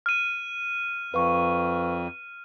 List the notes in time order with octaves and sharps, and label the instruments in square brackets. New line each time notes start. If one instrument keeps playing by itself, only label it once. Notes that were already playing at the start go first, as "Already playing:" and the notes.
[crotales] F6 D#7
[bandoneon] F2 [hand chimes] B4 F5 C#6